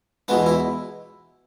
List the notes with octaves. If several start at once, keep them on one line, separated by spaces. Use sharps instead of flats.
E2 B2 G#3 B3 D4
E4